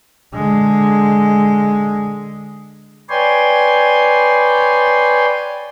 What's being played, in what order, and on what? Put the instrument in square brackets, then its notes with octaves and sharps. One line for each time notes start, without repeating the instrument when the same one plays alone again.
[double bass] D3 G#3
[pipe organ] B4 C#5 D5 G5 G#5 C6